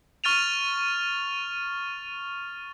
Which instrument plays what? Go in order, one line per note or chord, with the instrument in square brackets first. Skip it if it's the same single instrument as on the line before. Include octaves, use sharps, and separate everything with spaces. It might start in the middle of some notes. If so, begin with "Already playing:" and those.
[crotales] C#6 F6 A6 D#7 F7